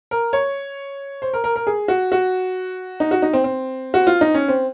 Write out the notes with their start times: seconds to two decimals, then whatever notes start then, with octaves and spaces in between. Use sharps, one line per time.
0.11 A#4
0.33 C#5
1.22 C5
1.33 A#4
1.44 A#4
1.56 A#4
1.67 G#4
1.88 F#4
2.12 F#4
3.00 D#4
3.11 F#4
3.22 D#4
3.33 C4
3.44 C4
3.94 F#4
4.07 F4
4.21 D#4
4.34 C#4
4.48 C4